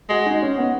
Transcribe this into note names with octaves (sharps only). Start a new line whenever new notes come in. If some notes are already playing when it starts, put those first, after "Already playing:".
G#3 F#4
D#4
C#4
B3